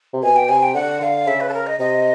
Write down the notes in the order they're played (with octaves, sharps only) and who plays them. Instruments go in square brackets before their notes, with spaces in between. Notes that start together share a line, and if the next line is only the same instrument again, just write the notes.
[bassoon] C3
[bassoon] B2 [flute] G#5
[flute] G5
[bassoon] C3 [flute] G#5
[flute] G5
[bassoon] D3 [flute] F#5
[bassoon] D3 [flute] F5
[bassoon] C#3 [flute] E5
[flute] B4
A4
A#4
D#5
[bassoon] C3 [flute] D#5